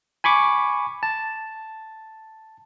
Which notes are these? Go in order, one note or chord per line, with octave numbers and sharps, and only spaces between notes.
G#5 B5 C#6 D6
A5